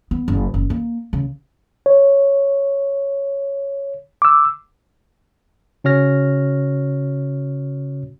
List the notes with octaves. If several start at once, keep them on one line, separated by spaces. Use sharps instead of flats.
B3
F#1
F#1
A#3
C#3
C#5
D6 E6
C#3 C#4 F#4 C#5 F6 A#6